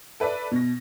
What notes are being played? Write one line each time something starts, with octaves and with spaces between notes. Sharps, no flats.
A4 B4 D5 E5
B2 A#6